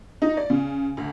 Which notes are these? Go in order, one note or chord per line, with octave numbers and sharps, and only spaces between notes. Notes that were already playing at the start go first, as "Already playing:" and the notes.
D#4
D5
C#3
D2